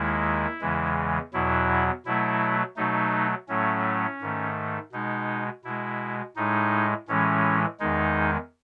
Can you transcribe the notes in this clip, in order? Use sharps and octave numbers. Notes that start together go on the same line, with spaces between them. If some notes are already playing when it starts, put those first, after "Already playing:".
Already playing: D#2 D#3 G#3 E4
E2 C#3 E3 G#3
E2 B2 F#3 E4
B2 F#3 A3 E4
B2 F#3 A3 D#4
A2 F#3 A3 C#4
G#2 D#3 A3
B2 G#3 D#4
B2 G#3 E4
A2 G#3 D#4
A2 E3 G#3 C#4
E2 D#3 G#3 D#4